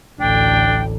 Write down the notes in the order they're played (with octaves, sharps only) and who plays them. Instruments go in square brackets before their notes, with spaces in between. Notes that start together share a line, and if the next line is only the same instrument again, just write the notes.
[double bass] A1 D2 [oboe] D4 [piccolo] G5